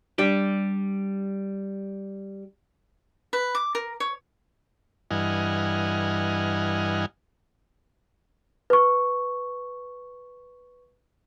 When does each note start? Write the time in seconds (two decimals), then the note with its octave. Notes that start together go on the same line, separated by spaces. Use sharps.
0.18 G3 D4 G4
3.33 B4
3.55 D6
3.75 A#4
4.00 C#5
5.11 G2 E3 D#5 F#5 G#5 F6
8.70 B4 C#6